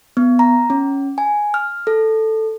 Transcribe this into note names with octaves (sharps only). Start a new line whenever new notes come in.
B3
A#5
C#4
G#5
F6
A4